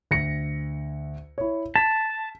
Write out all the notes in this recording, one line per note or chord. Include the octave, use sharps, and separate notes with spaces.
D2 A#6 C#7
E4 C#5
A5 B6